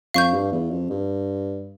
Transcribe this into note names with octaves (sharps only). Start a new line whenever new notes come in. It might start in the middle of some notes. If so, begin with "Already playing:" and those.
F2 F5 C#6 G6
G2
E2
F2
G2